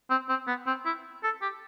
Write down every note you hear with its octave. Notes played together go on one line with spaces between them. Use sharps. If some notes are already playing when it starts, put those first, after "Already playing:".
C4
C4
B3
C4
E4
A4
G4